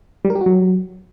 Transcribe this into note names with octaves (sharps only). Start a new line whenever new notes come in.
G3
A#4
G4
F#4
F#3